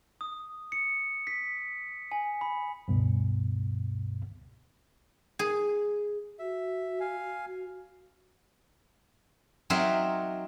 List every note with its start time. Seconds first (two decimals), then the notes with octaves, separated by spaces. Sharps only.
0.21 D#6
0.72 C#7
1.27 B6
2.12 G#5
2.41 B5
2.88 C#2 G2 B2
5.39 G#4
6.39 F#4 E5
7.00 F5 G#5
7.45 F#4
9.70 F#3 C4 D#4 A#4 E5